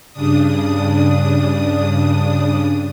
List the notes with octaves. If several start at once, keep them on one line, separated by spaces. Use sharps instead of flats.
G2 C#3 D4 D#6